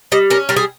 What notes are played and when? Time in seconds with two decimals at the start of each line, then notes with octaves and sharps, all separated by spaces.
0.12 G3 D#5
0.30 C#4 A#4
0.49 G3 A#4
0.56 G#4